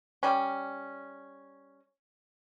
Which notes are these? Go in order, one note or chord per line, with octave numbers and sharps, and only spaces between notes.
G3 C#4